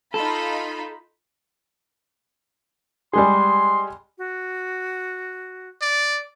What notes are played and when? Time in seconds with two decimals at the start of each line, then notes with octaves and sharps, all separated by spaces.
0.14 D#4 F4 A4 B5
3.13 G3 G#3 G#4 C6
4.18 F#4
5.82 D5